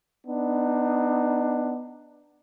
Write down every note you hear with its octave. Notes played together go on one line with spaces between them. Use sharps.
B3 D4 D#4